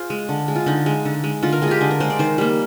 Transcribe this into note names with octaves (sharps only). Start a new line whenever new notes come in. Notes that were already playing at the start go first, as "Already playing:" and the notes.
Already playing: F4 G#4 C5
G#3
D3
G#3
F4
D3 D#4
G#3
D3
G#3
D3 F4
A#4
G#3 G#4
F4 G4
D3 G#4
A#4
G#3 C5
D5
D#3 C5
G3 A#3